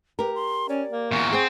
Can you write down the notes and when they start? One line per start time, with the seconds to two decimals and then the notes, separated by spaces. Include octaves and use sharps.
0.19 G4 A#4 B4
0.35 C6
0.69 C#4 D5
0.90 A#3
1.11 E2 A#2 C#6
1.32 C4 G#4 C5 F#5 G5